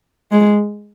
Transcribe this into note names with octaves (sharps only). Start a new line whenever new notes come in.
G#3